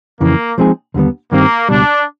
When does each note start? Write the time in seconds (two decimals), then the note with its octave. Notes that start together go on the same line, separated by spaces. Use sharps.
0.20 F2 C#3 E3 A#3
0.58 F3 G#3 C4 D#4 G#4
0.94 D#2 D3 G3 B3
1.31 G2 D#3 G3 A#3 C4
1.69 C#2 B2 G3 D4